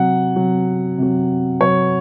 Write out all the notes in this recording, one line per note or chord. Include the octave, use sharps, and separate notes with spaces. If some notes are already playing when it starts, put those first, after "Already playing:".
Already playing: C3 F#3 F#5
C3 F#3
C3 F#3
C3 F#3 C#5